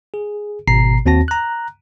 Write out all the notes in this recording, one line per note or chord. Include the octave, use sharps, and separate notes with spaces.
G#4
G#1 B2 A#5 C7
D#2 C4 F#4 A5 A#6
A#5 F#6